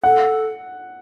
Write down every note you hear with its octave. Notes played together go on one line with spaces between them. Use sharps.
A4 F#5